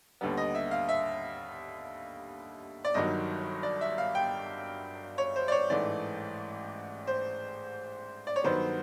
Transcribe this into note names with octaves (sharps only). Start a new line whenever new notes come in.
D#2 D3 G3 B3
D#5
E5
F5
E5
D5
G1 G2 D#3 F#3 D#5
D5
E5
F5
G5
C#5
C5
D5
C#5
A1 G#2 E3 A3 D5
C5
D5
C#5
G2 D#3 F#3 B3 C5